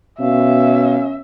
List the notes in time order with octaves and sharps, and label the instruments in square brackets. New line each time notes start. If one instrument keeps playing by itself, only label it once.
[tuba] B2 [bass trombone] C#4 [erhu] E5 [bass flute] F5